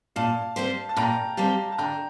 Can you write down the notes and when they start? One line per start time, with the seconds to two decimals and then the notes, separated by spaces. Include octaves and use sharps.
0.16 A#2 F5 A5
0.56 G3 C4 G4 C5
0.89 A5
0.96 A#2 G5 A#5
1.37 G3 C4 G4 C5 F5 A5
1.72 A5
1.78 D3 G5 A#5